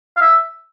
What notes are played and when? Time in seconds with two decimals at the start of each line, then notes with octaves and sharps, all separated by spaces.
0.17 F5
0.21 E5